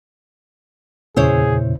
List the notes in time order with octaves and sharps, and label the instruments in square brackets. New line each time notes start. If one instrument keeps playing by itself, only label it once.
[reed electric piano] E2 C#3 [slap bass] A#2 C#4 [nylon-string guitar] E4 C5 C#5 [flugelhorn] G#4